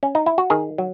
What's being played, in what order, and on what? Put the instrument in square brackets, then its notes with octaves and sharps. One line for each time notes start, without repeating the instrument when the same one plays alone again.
[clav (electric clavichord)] C#4
D#4
E4
F#4
D#3 G#4
F#3